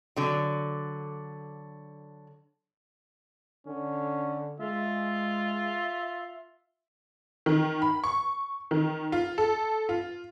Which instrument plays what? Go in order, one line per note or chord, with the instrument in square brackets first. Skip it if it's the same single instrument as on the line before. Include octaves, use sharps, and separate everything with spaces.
[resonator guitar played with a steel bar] D3 F#3
[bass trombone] D3 [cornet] C#4
[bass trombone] G#3 [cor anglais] F4 [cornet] E5
[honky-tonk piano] D#3
B5
C#6
D#3
F4
A4
F4